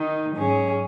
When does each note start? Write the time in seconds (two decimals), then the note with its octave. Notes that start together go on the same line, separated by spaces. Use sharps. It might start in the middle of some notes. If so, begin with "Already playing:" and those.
Already playing: D#3 D#4
0.34 G#2 F#3 C#4 G#4